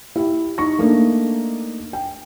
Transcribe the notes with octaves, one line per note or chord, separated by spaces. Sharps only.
E4 G4
D#4 C#6 A#6
A3 A#3 D4 D#4
G5